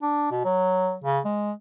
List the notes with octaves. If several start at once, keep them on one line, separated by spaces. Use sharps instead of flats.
D4
B2
F#3
C#3
G#3